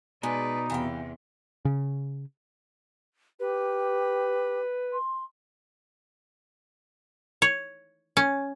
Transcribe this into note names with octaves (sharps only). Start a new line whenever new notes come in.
B2 G#3 D#4 B4 D5
E2 C3 E3 F5 G5
C#3
G4 B4
C6
C#5
C#4